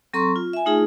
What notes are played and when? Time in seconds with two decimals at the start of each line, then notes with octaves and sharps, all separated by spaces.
0.14 F#3 C4 A4 A#5 C6 C#6
0.36 F4
0.53 E5 G#5
0.66 A3 D#4 F4 G#4